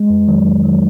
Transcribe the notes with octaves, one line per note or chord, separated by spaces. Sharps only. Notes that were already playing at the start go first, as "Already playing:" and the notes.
Already playing: G#3
F2
D#3 F#3
F2
D#3 F#3